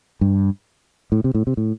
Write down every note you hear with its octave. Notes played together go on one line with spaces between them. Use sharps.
G2
A2
C3
A2
C3
A2